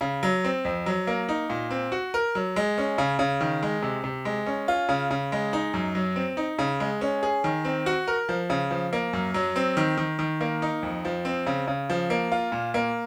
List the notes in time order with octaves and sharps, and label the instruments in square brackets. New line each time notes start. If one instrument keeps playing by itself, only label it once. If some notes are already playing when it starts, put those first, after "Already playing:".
[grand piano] C#3
F#3
C4
F2
F#3
A#3
D#4
A#2
C4
F#4
A#4
F#3
G#3
C#4
C#3
C#3
D#3
G#3
C3
C3
G#3
C#4
F4
C#3
C#3
G#3
D#4
F#2
F#3
C4
D#4
C#3
G#3
C#4
G#4
D#3
C4
F#4
A#4
F3
C#3
F3
A#3
F#2
F#3
C4
D#3
D#3
D#3
A#3
D#4
F2
F3
C4
C#3
C#3
F3
A#3
F4
A#2
A#3